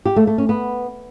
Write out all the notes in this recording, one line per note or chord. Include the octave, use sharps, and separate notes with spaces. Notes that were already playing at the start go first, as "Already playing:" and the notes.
G4
A3
A3
C#4
B3